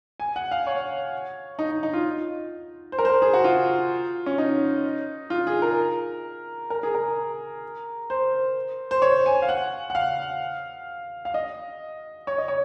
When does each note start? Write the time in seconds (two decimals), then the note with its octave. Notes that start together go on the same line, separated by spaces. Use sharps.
0.20 G#5
0.36 F#5
0.51 F5
0.67 C#5
1.59 D#4
1.71 D#4
1.83 D#4
1.94 F4
2.92 C5
2.99 A#4
3.05 C5
3.10 A#4
3.22 G#4
3.33 F#4
3.44 F4
4.26 C#4
4.38 D#4
5.30 F4
5.47 G#4
5.62 A#4
6.70 A#4
6.83 G#4
6.95 A#4
8.10 C5
8.91 C5
9.02 C#5
9.26 G#5
9.42 F5
9.49 F#5
9.90 F#5
9.95 F5
11.25 F5
11.34 D#5
12.27 C#5
12.38 D#5
12.48 C#5